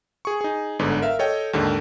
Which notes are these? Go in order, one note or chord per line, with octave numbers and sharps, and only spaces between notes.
G#4 C#6
D#4 G#4
G1 G#2 D3 B3
A#4 E5 F5
A4 C#5 D#5 G5
D#2 G#2 D3 D#3